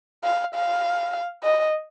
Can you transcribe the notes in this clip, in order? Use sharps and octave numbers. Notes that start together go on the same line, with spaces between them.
F5
F5
D#5